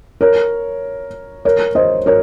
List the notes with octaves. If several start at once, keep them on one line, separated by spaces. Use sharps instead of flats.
A#4 C#5
A#4 C#5
C5 D#5
A#4 C#5